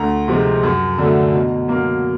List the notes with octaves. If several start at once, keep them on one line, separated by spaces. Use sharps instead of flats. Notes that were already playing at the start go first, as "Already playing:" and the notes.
Already playing: D2 A#5
C3 F3 G#3 C4
F#2
D3 F#3 A3
B2
F#3 A#3